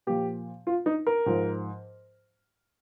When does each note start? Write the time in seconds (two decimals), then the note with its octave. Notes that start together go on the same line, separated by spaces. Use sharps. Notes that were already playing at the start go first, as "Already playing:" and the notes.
0.07 A#2 F3 G4
0.67 F4
0.86 D#4
1.07 A#4
1.26 G#2 F3